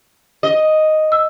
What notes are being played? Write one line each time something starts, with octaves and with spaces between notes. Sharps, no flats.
D#5
E6